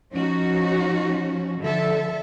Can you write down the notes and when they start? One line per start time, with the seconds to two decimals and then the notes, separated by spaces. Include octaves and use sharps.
0.14 F3 C#4 D#4 F#4
1.60 D3 F3 A4 E5